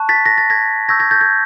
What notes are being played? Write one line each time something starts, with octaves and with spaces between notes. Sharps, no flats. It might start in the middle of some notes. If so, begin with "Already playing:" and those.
Already playing: A5 C#6 F#6
A6 B6
A#6
A6
G#6 A#6
C#6 E6 G6 G#6 A#6
G#6 A#6
G6 A6
G#6